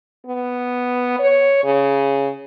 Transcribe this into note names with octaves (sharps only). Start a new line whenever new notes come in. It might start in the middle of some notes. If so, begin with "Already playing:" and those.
B3
C#5
C#3